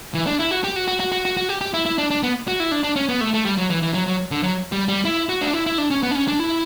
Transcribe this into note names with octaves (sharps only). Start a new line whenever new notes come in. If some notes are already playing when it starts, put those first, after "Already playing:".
E3
D4
E4
F#4
G4
F#4
F#4
F#4
F#4
F#4
F#4
G4
G4
E4
E4
D4
D4
B3
F#4
E4
D4
D4
C#4
B3
A3
A3
G3
F#3
E3
E3
F#3
F#3
D3
F#3
G3
G3
E4
F#4
D4
E4
E4
D4
C#4
B3
D4
C#4
D4
E4